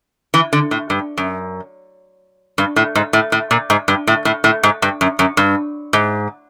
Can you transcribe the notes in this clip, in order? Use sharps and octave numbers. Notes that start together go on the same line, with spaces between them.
E3
D3
A2
G2
F#2
G2
A2
G#2
A2
A2
A#2
G#2
G2
A2
A2
A2
G#2
G2
F#2
F#2
G2
G#2